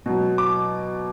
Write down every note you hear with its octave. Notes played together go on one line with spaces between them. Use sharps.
B2 F#3
D6